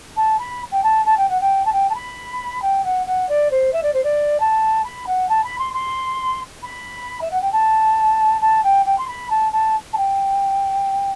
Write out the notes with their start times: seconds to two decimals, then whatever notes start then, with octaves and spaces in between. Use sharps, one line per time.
0.16 A5
0.39 B5
0.71 G5
0.83 A5
1.05 A5
1.17 G5
1.29 F#5
1.40 G5
1.65 A5
1.72 G5
1.89 A5
1.95 B5
2.62 G5
2.84 F#5
3.06 F#5
3.28 D5
3.51 C5
3.73 E5
3.83 D5
3.93 C5
4.03 D5
4.40 A5
4.84 B5
5.06 F#5
5.29 A5
5.43 B5
5.58 C6
5.73 C6
6.62 B5
7.21 E5
7.31 F#5
7.41 G5
7.52 A5
8.41 A5
8.63 G5
8.85 G5
8.98 C6
9.07 B5
9.30 A5
9.52 A5
9.93 A5
9.97 G5